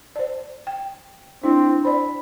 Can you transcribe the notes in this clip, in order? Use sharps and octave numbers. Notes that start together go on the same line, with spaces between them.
C5 D5
G5
C4 D4 E4
C5 D5 B5